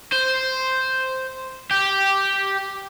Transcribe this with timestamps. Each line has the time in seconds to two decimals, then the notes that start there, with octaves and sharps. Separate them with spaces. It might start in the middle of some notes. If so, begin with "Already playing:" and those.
0.12 C5
1.71 G4